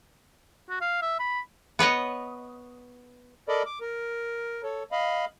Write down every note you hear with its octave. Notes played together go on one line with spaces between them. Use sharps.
F#4
F5
E5
B5
B3 B4 C#5 D#5
A4 A#4 D5 D#5 B5
D6
A#4
A4 C#5
D#5 F5 B5